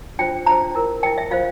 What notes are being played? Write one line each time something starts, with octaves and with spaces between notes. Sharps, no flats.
D4 F4 C5 G5
D4 F4 C5 A#5
E4 A#4
E4 A#4 G5
E5
F4 C5 F5